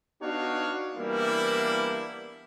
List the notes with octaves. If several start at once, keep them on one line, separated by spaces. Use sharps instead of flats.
B3 D4 D#4 F#4 C#5 F5
E3 G3 A#3 B3 D4 E4